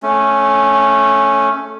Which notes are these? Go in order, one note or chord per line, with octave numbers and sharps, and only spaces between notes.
A3 C#4